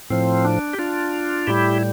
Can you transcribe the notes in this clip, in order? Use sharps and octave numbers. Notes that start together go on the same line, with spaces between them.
A2 F3 C4
D4
G4
D4 F4
A2 G3 E4 G4